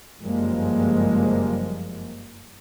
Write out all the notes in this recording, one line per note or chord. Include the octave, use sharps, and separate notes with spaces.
F#1 G2 F3 G3 G#3 A#3